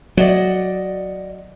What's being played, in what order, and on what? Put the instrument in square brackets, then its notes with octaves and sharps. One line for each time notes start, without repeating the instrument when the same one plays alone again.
[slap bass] F#3 [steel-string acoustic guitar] D5 D#5 F#5